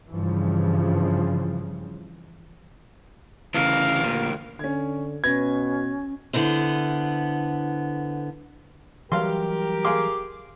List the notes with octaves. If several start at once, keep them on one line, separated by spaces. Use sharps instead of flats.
G2 C#3 E3 F3
D2 C#3 E3 A#4 F5
A#2
D3 C#4 G#6
B2 C#4 B4 G#6 A#6
D3 B3 E4 C5
E3 F#3 G3 G4 A#4 F5 C6
G#4 F5 C6 D6